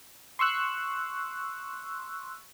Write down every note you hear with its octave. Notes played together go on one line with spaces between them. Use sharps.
C6 C#6 E6 F#6